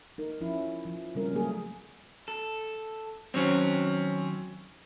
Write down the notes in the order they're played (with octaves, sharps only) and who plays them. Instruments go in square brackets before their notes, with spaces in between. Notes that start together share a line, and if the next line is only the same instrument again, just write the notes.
[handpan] D#4 A#4
F3 C#4 E4
F3
C#3 G3 C4 C#4 A#4
F#3 A3 A#3 G#4 A#4
[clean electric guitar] A4
[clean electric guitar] D#3 F#3 C#5 [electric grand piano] C4 C#4